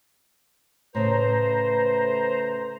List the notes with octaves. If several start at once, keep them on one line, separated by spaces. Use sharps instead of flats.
A2 C#3 A3 B4 C5 A#5